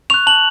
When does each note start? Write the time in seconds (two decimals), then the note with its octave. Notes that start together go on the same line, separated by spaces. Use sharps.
0.10 C#6 F#6 F7
0.27 A5 F#7